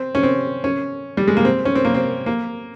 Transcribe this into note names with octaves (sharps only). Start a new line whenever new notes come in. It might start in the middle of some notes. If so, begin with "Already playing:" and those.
Already playing: C4
C#4
C4
C#4
G3
G#3
A#3
C4
C#4
C4
A#3
C4
A#3